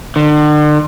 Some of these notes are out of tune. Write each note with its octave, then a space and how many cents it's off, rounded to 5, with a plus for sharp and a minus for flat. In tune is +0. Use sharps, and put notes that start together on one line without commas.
D3 +40